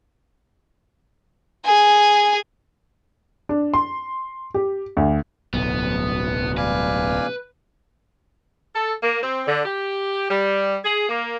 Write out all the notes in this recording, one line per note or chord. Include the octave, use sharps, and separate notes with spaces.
G#4 G#5
D4
C6
G4
D2
D1 B1 B3
B4 D5 F5 G#5
A4
A#3
C4
D3
G4
G3
G#4
A#3